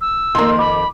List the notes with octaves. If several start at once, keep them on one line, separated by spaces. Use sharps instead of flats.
E6
F2 D#3 A#3 C6
B5 D6